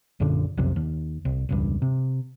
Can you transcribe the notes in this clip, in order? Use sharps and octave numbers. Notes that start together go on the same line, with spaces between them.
A#1 F#2 A#2 D3
B1 F2 C3
D#2
C2
E1 C#2 G2
C3